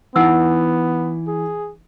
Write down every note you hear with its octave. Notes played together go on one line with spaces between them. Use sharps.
E3 B3 D#4 E4 F#5 E6
G#4